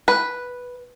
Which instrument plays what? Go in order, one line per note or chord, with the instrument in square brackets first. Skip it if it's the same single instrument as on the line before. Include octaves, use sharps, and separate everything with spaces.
[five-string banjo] B4